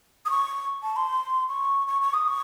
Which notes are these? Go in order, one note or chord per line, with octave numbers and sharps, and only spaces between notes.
D#6
C#6
A5
C6
C#6
C#6
C#6
D#6
C#6